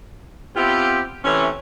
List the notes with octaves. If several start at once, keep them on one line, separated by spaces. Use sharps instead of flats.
B3 C4 E4 F4 G4
C3 E3 A3 C#4